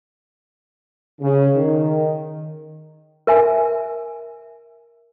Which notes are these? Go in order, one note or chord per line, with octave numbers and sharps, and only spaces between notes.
C#3
D#3
A#4 E5 G#5